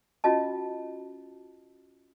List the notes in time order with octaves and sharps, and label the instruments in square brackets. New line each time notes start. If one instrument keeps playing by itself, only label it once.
[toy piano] C#4 F4 F#4 D#5 A5